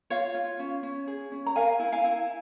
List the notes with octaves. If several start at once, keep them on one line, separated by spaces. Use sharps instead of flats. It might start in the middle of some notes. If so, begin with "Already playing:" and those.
F4 C#5 F5
F4
C#4
C#4
G#4
C#4
A#5
A#4 F5 G#5
E4
F5 G#5
E4